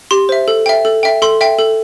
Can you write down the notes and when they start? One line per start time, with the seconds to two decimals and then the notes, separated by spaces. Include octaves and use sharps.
0.11 G4 C6
0.29 C5 E5
0.48 A4
0.66 E5 G5
0.85 A4
1.03 E5 G5
1.22 A4 C6
1.41 E5 G5
1.59 A4